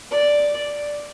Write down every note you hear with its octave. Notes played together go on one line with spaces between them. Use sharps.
D5